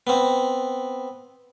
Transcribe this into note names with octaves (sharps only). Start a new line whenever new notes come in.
B3 C4